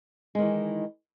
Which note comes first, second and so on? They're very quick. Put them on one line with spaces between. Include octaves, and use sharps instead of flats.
G#3 D#3 E3